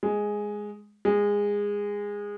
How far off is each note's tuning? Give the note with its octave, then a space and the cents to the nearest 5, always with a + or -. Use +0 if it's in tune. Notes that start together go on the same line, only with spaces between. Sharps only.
G#3 +0
G#3 -20